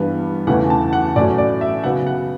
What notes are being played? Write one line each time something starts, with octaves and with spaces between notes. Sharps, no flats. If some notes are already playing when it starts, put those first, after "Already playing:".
Already playing: G2 E3 G3 B3
E2 C#3 E3 A3 C#4 F#5
A5
F#5
A2 F#3 A3 C#4 D5
D5
E5
C#3 F#3 B3 F#5
F#5